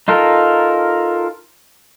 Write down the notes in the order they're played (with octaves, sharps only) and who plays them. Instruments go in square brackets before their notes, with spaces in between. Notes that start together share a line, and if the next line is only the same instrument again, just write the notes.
[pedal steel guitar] D#4 F4 A4 A#4